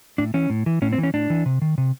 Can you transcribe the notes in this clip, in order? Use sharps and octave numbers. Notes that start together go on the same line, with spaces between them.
A2 D4
E3 C#4
A2
E3
A2 C#4
C4
E3
C#4
A2 D4
E3
C3
D#3
C3